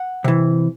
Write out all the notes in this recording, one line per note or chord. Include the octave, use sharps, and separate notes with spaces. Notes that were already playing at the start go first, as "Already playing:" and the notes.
Already playing: F#5
C3 E3